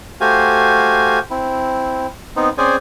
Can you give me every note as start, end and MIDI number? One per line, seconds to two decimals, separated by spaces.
0.21 1.19 57
0.21 1.19 66
0.21 1.19 67
0.21 1.19 72
0.21 1.19 77
0.21 1.19 80
1.30 2.07 60
1.30 2.07 64
2.36 2.49 59
2.36 2.49 60
2.36 2.49 63
2.58 2.76 60
2.58 2.76 61
2.58 2.76 68
2.58 2.76 72
2.58 2.76 74
2.58 2.76 80